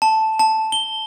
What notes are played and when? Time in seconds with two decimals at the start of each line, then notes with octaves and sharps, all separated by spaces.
0.02 A5
0.39 A5
0.72 G7